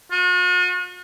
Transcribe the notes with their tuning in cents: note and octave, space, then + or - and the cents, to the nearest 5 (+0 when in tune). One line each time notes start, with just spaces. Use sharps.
F#4 -45